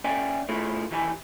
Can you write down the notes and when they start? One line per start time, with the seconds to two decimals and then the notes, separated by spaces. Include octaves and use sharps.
0.04 C#4 D5 E5 G5 G#5
0.49 A3 E4 F4 G#4
0.91 D#3 E3 E4 G4 G#5